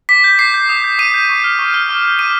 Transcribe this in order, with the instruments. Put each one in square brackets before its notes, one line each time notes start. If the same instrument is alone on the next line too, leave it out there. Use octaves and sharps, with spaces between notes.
[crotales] D6 B6
G6
D6 C7
G6
D#6
G6
D#6 D#7
G6
C#6
F6
C#6
F6
D6
G6
D6 D#7